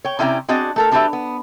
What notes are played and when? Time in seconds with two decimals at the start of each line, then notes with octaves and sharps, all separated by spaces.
0.04 C#5 G5
0.19 C3 C#4 E4 D5 G5 A#5
0.48 C4 D4 F#4 G#4 D5 D#5
0.76 A3 A4 A#4
0.91 G3 D4 F#4 G4 B4 E5
1.13 B3